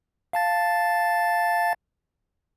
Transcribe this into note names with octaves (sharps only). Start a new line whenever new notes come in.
F5 A5 A6